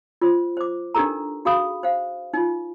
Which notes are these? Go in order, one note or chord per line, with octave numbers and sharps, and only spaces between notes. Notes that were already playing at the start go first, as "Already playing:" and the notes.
F4 C5
C5 D6
D4 D#4 G4 A4 A#4 A#5
F#4 G#4 F5 B5 D#6
C5 F5
D#4 F4